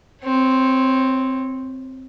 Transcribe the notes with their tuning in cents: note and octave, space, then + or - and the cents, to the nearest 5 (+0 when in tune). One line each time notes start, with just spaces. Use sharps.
C4 +0 C#5 -20